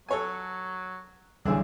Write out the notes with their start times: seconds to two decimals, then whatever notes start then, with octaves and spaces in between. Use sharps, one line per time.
0.09 F#3 A4 C#5 G#5
1.45 B1 D3 E3 G3 D4 G#4 E5